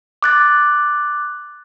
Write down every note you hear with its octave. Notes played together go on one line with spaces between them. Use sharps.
D6 F#6 A6